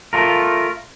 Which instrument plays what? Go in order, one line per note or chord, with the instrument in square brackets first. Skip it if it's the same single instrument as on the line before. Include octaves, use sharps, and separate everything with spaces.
[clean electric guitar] A3 F4 A#4